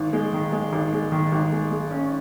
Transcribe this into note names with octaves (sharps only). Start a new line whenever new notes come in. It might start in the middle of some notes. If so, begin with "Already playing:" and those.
Already playing: G#1
G#3
D#3
G#3
G#1
G#3
D#3
G#1
G#3
G#3
C#4